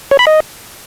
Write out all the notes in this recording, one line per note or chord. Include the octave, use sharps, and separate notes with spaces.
C#5
B5
D#5